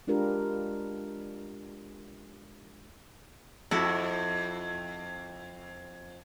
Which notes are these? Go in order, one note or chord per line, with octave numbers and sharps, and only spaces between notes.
G#3 D4 F4 G4 A#4 B4
F2 E4 F#4 A4